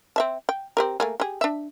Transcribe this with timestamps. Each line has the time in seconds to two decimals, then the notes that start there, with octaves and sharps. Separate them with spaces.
0.16 C4 E5 A5
0.49 G5
0.77 C4 G4 A#4
1.00 A3 A#3 G#4
1.20 G4 G#4
1.41 D4 E5